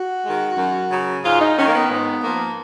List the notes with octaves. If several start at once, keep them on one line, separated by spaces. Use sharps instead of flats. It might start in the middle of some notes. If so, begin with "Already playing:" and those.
Already playing: F#4
D#3 G#3
F#2
C#3 F#3
G#2 F4
D#4
D#3 A#3 C#4
A#3
B3
G#2
F3 A#3